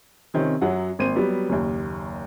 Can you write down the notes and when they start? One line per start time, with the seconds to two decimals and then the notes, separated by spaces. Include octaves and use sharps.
0.34 C3 D#3 C4 C#4
0.61 F#2 F#3 F#5
0.99 G#1 A#3 C5 D#7
1.16 F#3 G3 B3
1.49 F#1 D#2